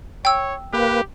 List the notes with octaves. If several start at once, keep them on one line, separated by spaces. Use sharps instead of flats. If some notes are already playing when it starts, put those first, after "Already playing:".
C#5 G5 E6
A#3 G4 B4